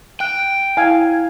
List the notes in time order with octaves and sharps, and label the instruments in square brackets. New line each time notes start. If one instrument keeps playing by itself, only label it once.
[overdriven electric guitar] G5 [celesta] F#6 D7
[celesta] E4 [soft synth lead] F5 [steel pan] G#5